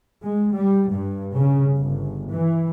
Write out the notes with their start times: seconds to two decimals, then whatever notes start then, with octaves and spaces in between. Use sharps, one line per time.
0.24 G#3
0.53 G3
0.90 G2
1.36 C#3
1.79 G1
2.30 E3